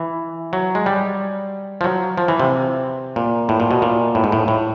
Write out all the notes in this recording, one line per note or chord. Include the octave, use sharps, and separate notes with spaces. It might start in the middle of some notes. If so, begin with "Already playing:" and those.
Already playing: E3
F#3
G#3
G3
F3
F#3
F3
E3
C3
A#2
A2
A#2
B2
A#2
A2
G#2
A2
A2